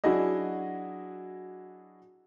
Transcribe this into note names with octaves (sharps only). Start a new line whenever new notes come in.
F#3 D4 E4 F#4 G#4 D#5